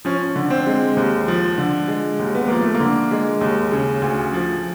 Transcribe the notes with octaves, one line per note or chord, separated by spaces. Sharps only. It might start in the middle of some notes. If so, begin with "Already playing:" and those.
F3 C#4
D3
C4
G#3
D#2
F3
D3
G#3
D#2
B3
F3 A#3
A3
A#3
D3
G#3
D#2
C#3
D2
F3